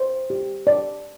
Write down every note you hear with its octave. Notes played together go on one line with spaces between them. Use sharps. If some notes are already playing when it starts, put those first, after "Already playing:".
Already playing: C5
G4
D5